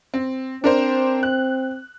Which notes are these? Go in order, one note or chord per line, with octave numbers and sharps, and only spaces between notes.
C4
C4 D4 A#4 C5
F#6